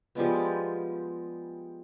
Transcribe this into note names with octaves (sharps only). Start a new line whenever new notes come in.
F3 G3 G#3 B3